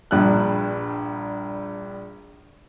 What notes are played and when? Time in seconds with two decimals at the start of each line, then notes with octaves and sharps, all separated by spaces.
0.11 A#1 G2 F#6